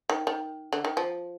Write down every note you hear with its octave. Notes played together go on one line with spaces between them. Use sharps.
D#3
D#3
D3
D#3
F3